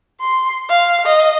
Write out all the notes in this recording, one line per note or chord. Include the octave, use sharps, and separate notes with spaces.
C6
F5
D#5